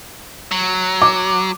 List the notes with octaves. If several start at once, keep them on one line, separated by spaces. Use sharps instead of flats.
F#3
D6